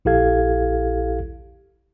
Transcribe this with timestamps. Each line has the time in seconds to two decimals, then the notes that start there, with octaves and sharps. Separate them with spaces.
0.05 A#1 E4 G4 A4 F5 G#6